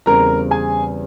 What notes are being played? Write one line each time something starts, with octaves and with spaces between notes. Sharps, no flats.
E2 C#3 G3 C4 A#4 A#5
G#4 G#5